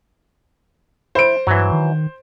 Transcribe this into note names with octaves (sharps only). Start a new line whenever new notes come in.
E4 C5 D7
G2 E3 F#3
D#3